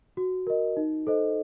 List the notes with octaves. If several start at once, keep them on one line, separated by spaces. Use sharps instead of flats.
F#4
A#4 D#5
D#4
A4 C5 D#5